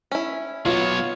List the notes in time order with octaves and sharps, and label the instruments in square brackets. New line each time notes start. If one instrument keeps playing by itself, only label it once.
[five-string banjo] C#4 E4
[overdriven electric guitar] F#3 B3 [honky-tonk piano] F4 [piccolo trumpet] C#5